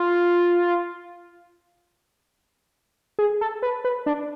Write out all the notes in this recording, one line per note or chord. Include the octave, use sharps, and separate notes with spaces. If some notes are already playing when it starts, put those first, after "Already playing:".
Already playing: F4
G#4
A4
B4
B4
D4